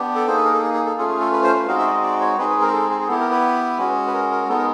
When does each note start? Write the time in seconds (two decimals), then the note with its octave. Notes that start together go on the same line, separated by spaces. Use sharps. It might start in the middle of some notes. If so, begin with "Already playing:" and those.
Already playing: B3 D4 G4
0.15 A4
0.27 A#3 D#4 G#4 C5
0.36 B4
0.45 A#4
0.53 A4
0.62 G#4
0.74 G#4
0.85 A4
0.97 A3 C#4 F4 G#4 A4
1.09 G#4
1.20 A4
1.32 B4
1.43 C5
1.56 B4
1.67 G#3 C4 D#4 F#4 F5
1.79 E5
1.87 D5
1.91 D#5
2.03 D5
2.21 C#5
2.38 G#3 C4 D#4 G#4 B4
2.49 B4
2.61 A#4
2.68 G#4
2.73 A4
2.90 G#4
3.01 G#4
3.08 B3 E4 G4 A4
3.20 A#4
3.31 B4
3.78 G#3 C#4 F#4
4.07 B4
4.13 A#4
4.31 A#4
4.48 G#3 B3 D#4 A4
4.57 A#4